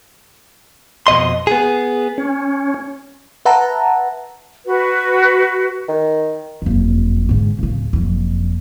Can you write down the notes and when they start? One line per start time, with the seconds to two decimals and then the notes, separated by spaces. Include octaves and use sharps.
1.07 F2 B2 D#5 C6
1.47 B3 G#4
2.18 C#4
3.45 B4 E5 F#5 A5 A#5
4.66 F#4 B4
5.88 D#3
6.62 F#1 F2
7.29 G#2 D3
7.59 D1 C#3
7.93 F#1 F2